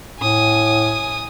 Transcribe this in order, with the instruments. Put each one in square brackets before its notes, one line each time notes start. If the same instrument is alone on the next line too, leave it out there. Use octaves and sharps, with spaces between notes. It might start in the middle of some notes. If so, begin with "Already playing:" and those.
[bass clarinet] A2 [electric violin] G#5 D#6